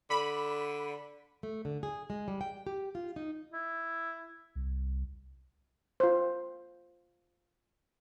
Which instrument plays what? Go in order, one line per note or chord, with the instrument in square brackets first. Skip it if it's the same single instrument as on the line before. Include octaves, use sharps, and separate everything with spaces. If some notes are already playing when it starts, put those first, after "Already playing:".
[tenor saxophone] D3 [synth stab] B5
[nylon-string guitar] A3
D3
G#4
G#3
G3
G5
G4
F4
D#4
[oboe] E4
[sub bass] C2
[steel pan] F4 C5